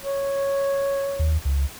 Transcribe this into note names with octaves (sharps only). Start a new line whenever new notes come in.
C#5
D#2
C#2